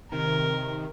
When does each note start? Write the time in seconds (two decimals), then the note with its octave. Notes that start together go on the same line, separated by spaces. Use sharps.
0.12 C3 D#3 A#4